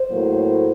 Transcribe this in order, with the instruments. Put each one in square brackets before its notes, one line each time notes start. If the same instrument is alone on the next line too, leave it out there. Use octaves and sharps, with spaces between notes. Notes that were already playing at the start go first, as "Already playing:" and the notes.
Already playing: [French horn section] C5
A2 F#3 A#3